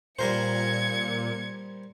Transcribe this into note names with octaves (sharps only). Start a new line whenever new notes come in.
A#2 G3 A#4 C5 G#6 C#7